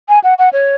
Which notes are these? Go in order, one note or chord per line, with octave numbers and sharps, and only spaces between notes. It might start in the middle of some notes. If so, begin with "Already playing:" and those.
G#5
F#5
F#5
C#5